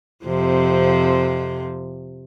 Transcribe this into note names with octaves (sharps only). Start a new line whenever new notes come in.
F2 C3 F3